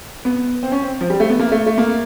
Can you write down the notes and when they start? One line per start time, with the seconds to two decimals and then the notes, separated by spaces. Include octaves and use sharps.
0.25 B3
0.63 C4
0.72 C#4
0.82 C4
1.01 F3
1.10 G3
1.20 A3
1.30 B3
1.40 A#3
1.52 A3
1.67 A3
1.78 A#3